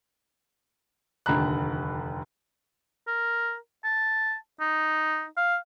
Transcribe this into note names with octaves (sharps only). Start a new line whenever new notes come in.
F1 D#2 D3 A#5 B5 F#6
A#4
A5
D#4
F5